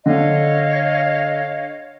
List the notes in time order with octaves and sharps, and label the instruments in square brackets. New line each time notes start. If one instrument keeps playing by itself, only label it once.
[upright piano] D3 [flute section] C#5 D#5 F5